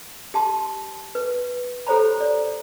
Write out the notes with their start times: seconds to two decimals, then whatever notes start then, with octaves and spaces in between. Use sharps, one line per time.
0.34 G4 A5 C6
1.15 B4
1.87 G4 A4 C5 C#5 A#5 B5
2.21 D5